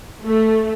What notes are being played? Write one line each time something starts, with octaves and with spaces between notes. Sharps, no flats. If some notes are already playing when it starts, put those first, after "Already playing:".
A3